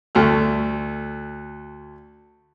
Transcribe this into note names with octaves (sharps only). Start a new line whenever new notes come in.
D2 A3 F6